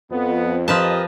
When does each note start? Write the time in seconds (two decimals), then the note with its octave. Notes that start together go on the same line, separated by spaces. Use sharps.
0.11 F2 B3
0.68 F3 G4 A#4 B4 D#5 A5